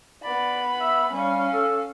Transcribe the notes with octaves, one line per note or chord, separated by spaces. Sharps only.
B3 D5 B5
E5
G3 C#4 F5
A4